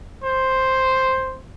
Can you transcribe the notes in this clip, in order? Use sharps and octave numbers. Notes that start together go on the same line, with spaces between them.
C5